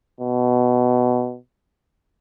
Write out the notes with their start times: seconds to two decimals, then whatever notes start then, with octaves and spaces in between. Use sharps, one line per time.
0.21 B2